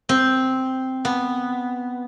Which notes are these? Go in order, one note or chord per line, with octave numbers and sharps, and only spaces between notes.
C4
B3